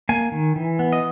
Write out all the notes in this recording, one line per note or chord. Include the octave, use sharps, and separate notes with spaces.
A#3 G#5
D#3
E3
B3
D#5